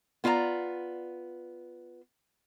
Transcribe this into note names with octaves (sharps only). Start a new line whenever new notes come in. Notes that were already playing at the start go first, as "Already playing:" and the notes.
B3 F4 D5 A5 A#5